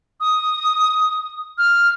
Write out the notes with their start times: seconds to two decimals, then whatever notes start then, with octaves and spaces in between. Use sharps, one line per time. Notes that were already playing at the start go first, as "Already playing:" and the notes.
0.20 D#6
1.58 F6